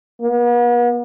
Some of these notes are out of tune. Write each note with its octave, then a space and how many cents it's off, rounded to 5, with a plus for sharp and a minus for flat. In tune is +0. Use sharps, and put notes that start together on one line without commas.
B3 -45